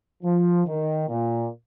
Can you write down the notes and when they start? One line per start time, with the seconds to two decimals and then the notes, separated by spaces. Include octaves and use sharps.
0.23 F3
0.66 D#3
1.09 A#2